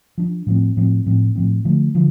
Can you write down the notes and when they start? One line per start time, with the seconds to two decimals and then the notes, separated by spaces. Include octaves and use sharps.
0.18 F3 D4
0.47 A2 F3 C4
0.77 A2 F3 C4
1.06 A2 F3 C4
1.36 A2 F3 C4
1.65 D3 F3 A3
1.95 D3 F3